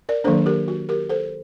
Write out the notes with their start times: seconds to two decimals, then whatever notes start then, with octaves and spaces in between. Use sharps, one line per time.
0.09 A#4 D5
0.24 D#3 F#3 A#3 D4 A4 C5
0.46 G4 A#4
0.68 F#4
0.89 G4 A#4
1.10 A4 C5